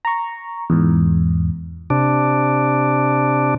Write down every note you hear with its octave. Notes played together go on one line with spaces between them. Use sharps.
A#5 C#6
E2 G#2
C3 D4